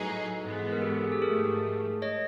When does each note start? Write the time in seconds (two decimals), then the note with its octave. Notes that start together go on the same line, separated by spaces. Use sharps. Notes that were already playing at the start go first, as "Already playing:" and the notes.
Already playing: A2 F#3 D#4 G#4 A4 B4
0.41 G#2 E3 G#3 B3
0.73 A#4
0.81 G4 A4
1.01 G#4
1.12 G4 A4
1.22 G#2 F3 A3 G#4 A#4
2.02 C#5 D#5